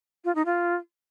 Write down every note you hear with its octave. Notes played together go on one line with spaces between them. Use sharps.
F4
D#4
F4